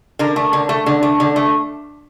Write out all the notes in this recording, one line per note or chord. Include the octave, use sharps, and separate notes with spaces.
D3 A#4
A3
D3
A3
D3
A3
D3
A3